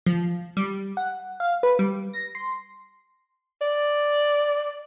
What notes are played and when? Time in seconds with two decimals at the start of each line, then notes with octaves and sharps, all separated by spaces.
0.06 F3
0.57 G3
0.97 F#5
1.40 F5
1.63 B4
1.79 G3
2.14 A#6
2.35 C6
3.61 D5